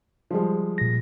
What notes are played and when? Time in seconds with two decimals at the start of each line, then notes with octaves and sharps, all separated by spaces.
0.31 F3 G3 G#3
0.78 A#2 A#6